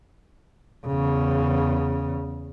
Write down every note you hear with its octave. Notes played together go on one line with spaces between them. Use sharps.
E2 C#3